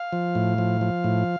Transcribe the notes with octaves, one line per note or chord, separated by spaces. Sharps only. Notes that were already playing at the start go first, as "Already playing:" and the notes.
Already playing: F5
F3
A2
F3
F3
A2